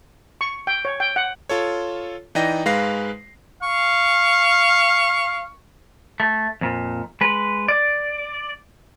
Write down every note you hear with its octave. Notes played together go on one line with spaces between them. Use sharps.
C#6
G5
C#5
G5
F#5
F4 A4 C#5
E3 D#4 D5 D#5 G5 A#6
G#2 G#3 B4 F5 A#6 C7
F5 C#6
A3
F2 A#2
G#3 B4
D5